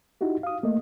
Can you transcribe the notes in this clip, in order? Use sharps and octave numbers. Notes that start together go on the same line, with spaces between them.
D#4 E4 F#4 G4
F5 D#6
A3 A#3 D#5